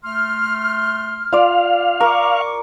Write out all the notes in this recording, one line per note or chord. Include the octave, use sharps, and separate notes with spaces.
A3 C6 F6
F4 D5 F5
A#4 C#6 D6